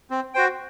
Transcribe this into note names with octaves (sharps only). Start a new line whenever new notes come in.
C4
F#4 C5 G5